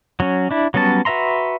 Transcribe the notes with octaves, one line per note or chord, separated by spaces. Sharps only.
F#3 C#4
D4 E4
F#3 G3 B3 C#4 A5
F#4 B4 E5 A#5 C6